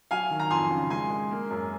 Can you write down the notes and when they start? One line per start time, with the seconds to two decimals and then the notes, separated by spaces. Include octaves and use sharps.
0.11 F#3 F5 G#5
0.31 D#3
0.40 A#5
0.50 F2 G#5 C6
0.71 C#3
0.90 G#3 G#5 C6
1.10 G#3
1.31 A#3
1.51 F#2